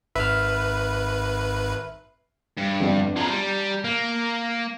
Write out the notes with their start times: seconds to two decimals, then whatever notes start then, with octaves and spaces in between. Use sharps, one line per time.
0.15 G#1 B4 E5 F6
2.58 G2
2.81 G1 F2 D4
3.17 F3 G#4 A5 A#5
3.30 G3
3.84 A#3